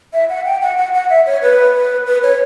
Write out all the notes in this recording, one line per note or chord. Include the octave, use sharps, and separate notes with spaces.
E5
F#5
G5
F#5
F#5
F#5
E5
C#5
B4
B4
B4
C#5